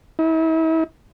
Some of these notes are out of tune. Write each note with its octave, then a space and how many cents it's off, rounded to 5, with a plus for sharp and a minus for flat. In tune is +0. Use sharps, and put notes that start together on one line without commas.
E4 -40